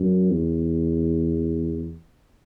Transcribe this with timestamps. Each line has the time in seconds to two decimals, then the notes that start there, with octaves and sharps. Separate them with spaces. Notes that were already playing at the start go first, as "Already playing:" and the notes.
Already playing: F#2
0.31 E2